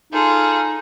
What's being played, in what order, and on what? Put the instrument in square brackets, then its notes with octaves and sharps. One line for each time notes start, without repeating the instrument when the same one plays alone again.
[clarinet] D#4 [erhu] F4 [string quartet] G#4 A4